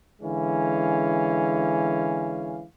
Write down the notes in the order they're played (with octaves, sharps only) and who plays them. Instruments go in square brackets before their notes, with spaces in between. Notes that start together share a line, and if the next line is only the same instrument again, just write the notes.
[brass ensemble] D3 E3 G#3 C#4 F5